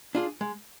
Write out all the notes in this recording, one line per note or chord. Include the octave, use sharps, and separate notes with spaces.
D4 F4 G#4
G#3